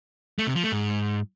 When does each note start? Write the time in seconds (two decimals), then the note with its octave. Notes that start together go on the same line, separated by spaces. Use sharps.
0.39 A3
0.47 C3
0.55 F3
0.64 A3
0.72 G#2